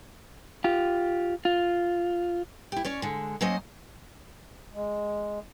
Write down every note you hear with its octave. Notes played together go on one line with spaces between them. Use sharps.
F4 G4
F4
E4 G4
C#4 C#5 D5
D3 G#3
F#3 A#3 C#4 C5 D#5
G#3